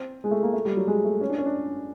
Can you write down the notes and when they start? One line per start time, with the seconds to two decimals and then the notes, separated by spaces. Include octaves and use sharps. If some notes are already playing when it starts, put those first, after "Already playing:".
Already playing: C4
0.24 G#3
0.31 A3
0.43 A#3
0.53 A3
0.65 G3
0.77 F#3
0.87 G#3
1.05 A3
1.21 C#4
1.30 D4
1.38 C#4
1.46 D4